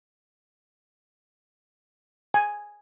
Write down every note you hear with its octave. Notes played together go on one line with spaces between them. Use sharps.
G#5